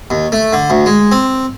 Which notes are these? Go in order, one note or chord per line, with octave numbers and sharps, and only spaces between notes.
D#2
A3
D3
D2
G#3
C4